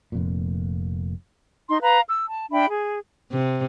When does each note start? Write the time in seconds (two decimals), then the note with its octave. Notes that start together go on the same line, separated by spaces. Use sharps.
0.12 F1 F2 A#2
1.69 D#4 C6
1.81 B4 F5 A#5
2.08 E6
2.28 A5
2.51 D4 E5 G5 B5
2.68 G#4
3.32 C3